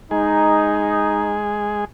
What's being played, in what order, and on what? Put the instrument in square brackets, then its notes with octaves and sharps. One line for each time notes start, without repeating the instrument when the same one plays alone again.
[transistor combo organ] G#3 G#4 [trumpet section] D#4